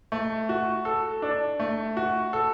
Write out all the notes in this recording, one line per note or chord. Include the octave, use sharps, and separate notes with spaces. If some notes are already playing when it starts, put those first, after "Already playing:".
A3
F#4
A4
D4
A3
F#4
A4